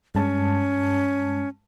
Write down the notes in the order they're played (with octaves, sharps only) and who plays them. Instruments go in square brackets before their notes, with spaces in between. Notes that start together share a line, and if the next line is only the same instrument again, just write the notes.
[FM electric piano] G2 G#3 A5 [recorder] C#4